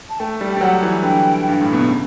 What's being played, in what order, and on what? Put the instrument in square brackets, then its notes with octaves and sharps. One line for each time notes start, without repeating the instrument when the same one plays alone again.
[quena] A5
[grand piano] A3 [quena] G5
[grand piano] G3
[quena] G5
[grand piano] G3
[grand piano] F#3 [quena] F#5
[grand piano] E3
[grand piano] D3 [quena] G5
[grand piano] G2
A2
B2
C#3